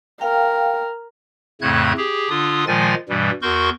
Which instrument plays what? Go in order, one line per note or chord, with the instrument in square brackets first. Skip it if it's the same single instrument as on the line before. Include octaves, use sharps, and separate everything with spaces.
[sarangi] A#4 [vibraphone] F5 G5
[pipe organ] F2 A2 C#3 A3 F#6 G#6
G4 G#4
D3 D4 F4 D#6
A#2 D#3 F3 G#3 G#5 A6
G2 B2 E3 G3
E2 F#4 A#4 C6 C#6 G6